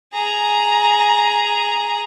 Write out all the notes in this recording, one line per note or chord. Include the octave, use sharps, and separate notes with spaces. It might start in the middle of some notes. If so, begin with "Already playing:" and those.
G#4 A#5